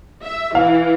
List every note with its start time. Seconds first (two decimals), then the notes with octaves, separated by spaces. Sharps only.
0.23 E5
0.55 E3 F5